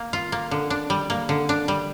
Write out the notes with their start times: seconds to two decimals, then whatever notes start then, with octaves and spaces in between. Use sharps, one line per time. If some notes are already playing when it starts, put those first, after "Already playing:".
Already playing: A#3
0.13 F4
0.32 A#3
0.51 D3
0.70 D4
0.90 G3
1.10 A#3
1.29 D3
1.49 D4
1.68 G3